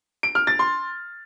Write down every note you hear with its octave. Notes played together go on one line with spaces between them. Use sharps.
D7
F6
A6
C6